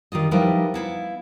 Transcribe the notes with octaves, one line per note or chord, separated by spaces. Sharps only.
D#3 G3 F4 D#5
F3 G3 D#4 E4 A#4 B4
B3 E4 F5